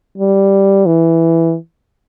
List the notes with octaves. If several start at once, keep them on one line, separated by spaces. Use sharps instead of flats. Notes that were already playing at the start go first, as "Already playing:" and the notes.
G3
E3